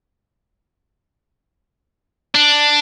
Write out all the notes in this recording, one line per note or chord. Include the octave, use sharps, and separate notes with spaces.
D4